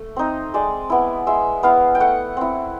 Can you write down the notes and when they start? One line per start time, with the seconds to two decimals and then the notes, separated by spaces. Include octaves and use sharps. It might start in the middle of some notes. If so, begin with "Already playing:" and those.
Already playing: A3
0.16 C4 D#4
0.54 G#3 D5
0.90 B3 E4
1.27 G#3 E5
1.63 B3 E4 F5
1.95 G5
2.00 A3 F#5
2.37 C4 E4